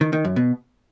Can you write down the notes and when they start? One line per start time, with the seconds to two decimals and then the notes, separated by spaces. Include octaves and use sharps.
0.01 D#3
0.13 D#3
0.25 F#2
0.36 B2